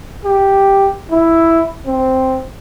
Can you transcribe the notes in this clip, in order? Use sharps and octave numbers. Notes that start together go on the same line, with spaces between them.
G4
E4
C4